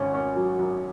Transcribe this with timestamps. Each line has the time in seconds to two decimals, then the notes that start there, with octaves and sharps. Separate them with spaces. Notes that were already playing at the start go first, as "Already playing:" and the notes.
Already playing: G#1 C#4
0.14 C#4
0.36 F#3
0.59 F#2